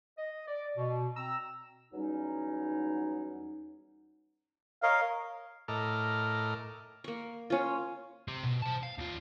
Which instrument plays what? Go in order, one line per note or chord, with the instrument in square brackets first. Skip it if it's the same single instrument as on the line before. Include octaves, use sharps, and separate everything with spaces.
[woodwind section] D#5
D5
B2
C4 A#5 E6
E2 F#3 G3 C#4 D#4
[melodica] A#4 C#5 D#5 [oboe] F5
[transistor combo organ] A2 A4 A#4 D#5 D6 F6
[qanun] A#3 C#6
C#4 F4
[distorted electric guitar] C4 G4
B2
C5 A5
F5
D#2 F4